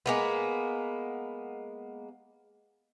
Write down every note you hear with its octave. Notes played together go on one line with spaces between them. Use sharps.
G#3 A#3 B3